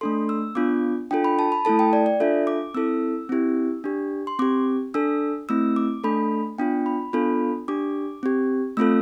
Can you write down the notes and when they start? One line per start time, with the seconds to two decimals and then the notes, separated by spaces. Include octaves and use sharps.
0.01 A3 D4 A4 C6
0.29 E6
0.55 B3 D4 F4 D6
1.11 D4 F4 A4 G5
1.24 B5
1.39 A5
1.52 B5
1.65 A3 E4 A4 A5
1.79 G5
1.93 D5
2.06 D5
2.20 D4 F4 A4 E5
2.47 D6
2.74 C4 E4 A4 E6
3.29 C4 E4 G4
3.84 D4 G4
4.27 C6
4.39 C4 G4 D6
4.94 D4 A4 E6
5.49 A3 C4 E4 E6
5.76 D6
6.04 A3 D4 A4 B5
6.58 B3 D4 F4 G5
6.86 B5
7.13 B3 D4 F4 A4 B5
7.68 D4 G4 D6
8.23 C4 G4
8.77 A3 C4 F4 A4 E6